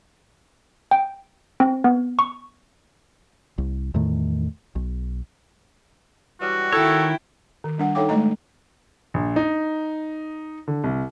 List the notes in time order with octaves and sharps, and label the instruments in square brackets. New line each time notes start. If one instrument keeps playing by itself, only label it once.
[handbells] G5
C4
B3
C#6
[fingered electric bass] C2
E2 A2 D#3 A3
B1
[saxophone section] E3 F#3 G3 [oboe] F#4
[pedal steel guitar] D#3 C#5 [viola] E4 G5 [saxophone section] A4
[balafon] D#3
G3 D4 F#5
D#4 A4 C#5 F5 G5 D6
G#3 A3 D#5 A#5
[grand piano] A#1
D#4
D3
C2